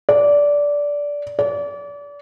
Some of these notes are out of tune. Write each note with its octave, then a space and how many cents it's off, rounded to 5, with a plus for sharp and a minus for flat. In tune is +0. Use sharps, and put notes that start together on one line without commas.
D5 -15
D5 -35